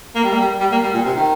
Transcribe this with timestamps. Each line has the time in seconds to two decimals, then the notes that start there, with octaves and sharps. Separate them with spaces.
0.15 A#3
0.24 G3
0.33 A#3
0.41 G3
0.60 G3
0.72 A#3
0.83 G3
0.94 A#2
1.06 C3
1.16 D#3